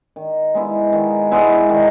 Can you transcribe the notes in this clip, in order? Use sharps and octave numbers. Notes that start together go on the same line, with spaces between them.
D#3
G#3 B3 E4
D#3
G#3 B3 E4
D#3